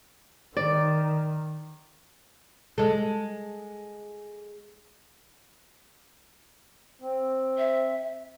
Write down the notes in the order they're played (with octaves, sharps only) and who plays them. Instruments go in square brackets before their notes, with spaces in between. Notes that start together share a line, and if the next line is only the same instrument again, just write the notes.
[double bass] D#3 [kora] D5
[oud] G#3 A4
[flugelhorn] C4
[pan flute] E5